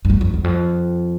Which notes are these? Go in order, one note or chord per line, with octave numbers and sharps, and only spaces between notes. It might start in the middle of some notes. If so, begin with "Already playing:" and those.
G2
F2
F2
E2
F2